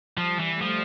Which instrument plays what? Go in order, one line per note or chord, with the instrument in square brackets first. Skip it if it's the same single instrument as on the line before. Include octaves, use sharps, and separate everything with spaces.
[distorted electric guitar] F3 [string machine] G3
[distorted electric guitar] E3
[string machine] A3
[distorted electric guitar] F3